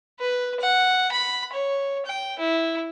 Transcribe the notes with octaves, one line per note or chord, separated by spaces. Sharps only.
B4
F#5
B5
C#5
G5
E4